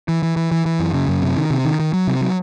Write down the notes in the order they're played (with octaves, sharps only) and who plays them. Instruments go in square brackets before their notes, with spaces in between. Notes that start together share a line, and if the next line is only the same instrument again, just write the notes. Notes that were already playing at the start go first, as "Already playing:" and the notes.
[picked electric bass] E3
E3
E3
E3
E3
F#2
C#3
F#2
C3
D#3
C3
D#3
D#3
F#3
C3
F#3